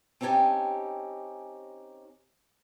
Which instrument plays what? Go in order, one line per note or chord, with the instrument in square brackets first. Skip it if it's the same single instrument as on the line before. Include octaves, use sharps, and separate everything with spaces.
[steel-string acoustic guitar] C4 C#4 D#4 G4 G#5 A5